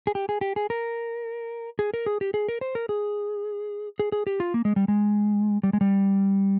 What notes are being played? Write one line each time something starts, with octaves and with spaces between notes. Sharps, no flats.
G#4
G4
G#4
G4
G#4
A#4
G#4
A#4
G#4
G4
G#4
A#4
C5
A#4
G#4
G#4
G#4
G4
F4
A#3
G#3
G3
G#3
G3
G#3
G3